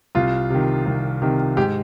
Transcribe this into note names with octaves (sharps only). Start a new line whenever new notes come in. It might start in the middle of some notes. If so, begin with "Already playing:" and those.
C2 F4
C3 D#3
C2
C3 D#3
G#2 G4